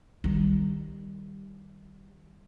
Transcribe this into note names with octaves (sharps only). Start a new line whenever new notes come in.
D#3 G3